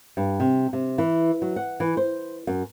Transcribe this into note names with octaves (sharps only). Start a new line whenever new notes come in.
G2
C3
C3
E3
F#3
F#5
E3
C5
F#2